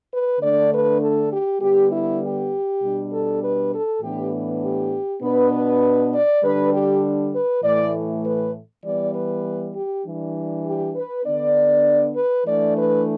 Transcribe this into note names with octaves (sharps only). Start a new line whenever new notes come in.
B4
D3 A3 D4 D5
B4
A4
G4
D3 G3 B3 G4
E4
G4
B2 G3 D4
A4
B4
A4
A2 E3 B3 D4 G4
G4
B2 B3 D4 B4
B4
D5
D3 G3 D4 B4
G4
B4
A2 E3 A3 D5
B4
E3 G3 B3 D5
B4
G4
E3 G3 D4
G4
B4
D3 B3 D4 D5
B4
E3 A3 D4 D5
B4